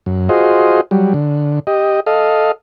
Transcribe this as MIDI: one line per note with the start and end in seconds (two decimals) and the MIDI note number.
0.06 0.29 42
0.29 0.81 65
0.29 0.81 66
0.29 0.81 68
0.29 0.81 72
0.29 0.81 75
0.91 1.13 54
0.91 1.13 55
1.14 1.59 50
1.67 2.00 67
1.67 2.00 75
2.06 2.52 69
2.06 2.52 75
2.06 2.52 77